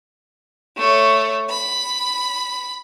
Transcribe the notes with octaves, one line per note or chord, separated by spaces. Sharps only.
A3 C#5
B5